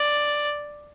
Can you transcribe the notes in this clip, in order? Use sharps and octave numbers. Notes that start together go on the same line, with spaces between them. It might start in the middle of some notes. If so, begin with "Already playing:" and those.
Already playing: D5